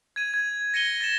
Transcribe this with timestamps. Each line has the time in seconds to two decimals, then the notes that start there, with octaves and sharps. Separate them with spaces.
0.16 G#6 D#7
0.34 G#6
0.74 A#6 C#7 D#7 G7
1.01 A6 A#6 E7